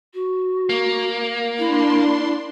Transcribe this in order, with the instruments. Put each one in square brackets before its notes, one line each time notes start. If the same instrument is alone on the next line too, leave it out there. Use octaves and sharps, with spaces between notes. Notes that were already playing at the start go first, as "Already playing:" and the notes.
[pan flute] F#4
[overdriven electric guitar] A#3
[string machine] D4 C6 [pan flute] E4